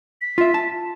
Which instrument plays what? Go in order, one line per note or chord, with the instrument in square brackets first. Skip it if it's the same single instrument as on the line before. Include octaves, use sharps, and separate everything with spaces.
[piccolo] B6
[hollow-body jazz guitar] F4 E5
A5